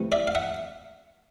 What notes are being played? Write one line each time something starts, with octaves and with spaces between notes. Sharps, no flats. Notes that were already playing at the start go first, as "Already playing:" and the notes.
Already playing: C3 E3 A3
D5 E5
F5
E5 F#5